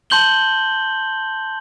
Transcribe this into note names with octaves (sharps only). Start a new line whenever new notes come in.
A5 C6 G6 F#7 G7